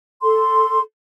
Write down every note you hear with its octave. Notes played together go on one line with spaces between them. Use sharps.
A4 C6